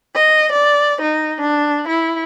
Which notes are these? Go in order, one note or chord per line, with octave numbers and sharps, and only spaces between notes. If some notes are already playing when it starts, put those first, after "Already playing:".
D#5
D5
D#4
D4
E4